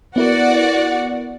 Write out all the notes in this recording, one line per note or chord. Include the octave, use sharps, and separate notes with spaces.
B3 E4 F#4 A#4 D5 F#5